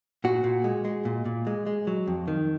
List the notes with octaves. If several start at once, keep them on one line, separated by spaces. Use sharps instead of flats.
A#2 F#4
A#2
G#3
G#3
A#2
A#2
G#3
G#3
F#3
F2
D#3